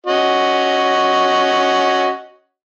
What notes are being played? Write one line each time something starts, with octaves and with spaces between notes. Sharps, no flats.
C#4 F#4 D#5